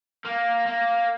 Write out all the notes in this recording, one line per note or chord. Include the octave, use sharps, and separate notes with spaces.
A#3
A#3